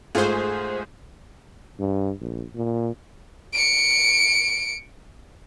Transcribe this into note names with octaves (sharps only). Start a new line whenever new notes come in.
G#2 A3 F4 G#4 C5
G2
A#1
A#2
C#7 D7